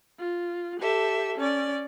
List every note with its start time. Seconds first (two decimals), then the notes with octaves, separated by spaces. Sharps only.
0.19 F4
0.80 G4 A4 E5
1.38 C#4 D5